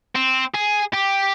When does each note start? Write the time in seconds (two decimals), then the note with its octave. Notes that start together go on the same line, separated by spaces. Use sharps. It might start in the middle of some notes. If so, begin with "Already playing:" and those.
0.16 C4
0.54 G#4
0.93 G4